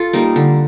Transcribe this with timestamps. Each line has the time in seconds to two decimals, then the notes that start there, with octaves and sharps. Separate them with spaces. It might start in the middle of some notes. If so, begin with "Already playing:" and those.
Already playing: F4 A4
0.13 G3 A#3 D#4
0.36 D3